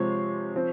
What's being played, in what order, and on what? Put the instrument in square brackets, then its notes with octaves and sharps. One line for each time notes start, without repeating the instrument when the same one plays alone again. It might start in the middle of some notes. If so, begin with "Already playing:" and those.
Already playing: [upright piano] C3 F3 G#3 C4 C#5
F3 C4